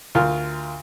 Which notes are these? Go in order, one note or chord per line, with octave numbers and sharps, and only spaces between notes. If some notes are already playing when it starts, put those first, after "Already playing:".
D2 F4 A#4